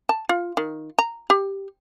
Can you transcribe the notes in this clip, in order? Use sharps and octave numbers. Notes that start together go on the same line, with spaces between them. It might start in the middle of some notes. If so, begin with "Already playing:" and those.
A5
F4
D#3
A#5
G4